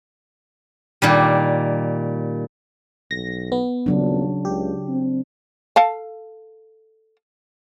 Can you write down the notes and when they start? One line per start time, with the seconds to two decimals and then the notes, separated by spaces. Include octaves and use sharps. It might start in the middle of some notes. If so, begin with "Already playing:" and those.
1.02 A#2 D#3 G3
3.11 B1 A#6
3.52 B3
3.86 D#1 C#3 F#3 D4
4.45 C#2 G4
4.88 C4
5.76 A4 F5 A5